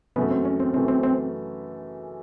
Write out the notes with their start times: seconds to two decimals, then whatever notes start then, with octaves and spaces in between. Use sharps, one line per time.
0.16 F#2 C#3 E3 A3 B3
0.31 C4
0.45 C#4
0.60 C4
0.74 F#2 C#3 E3 A3 C4
0.88 C4
1.03 C4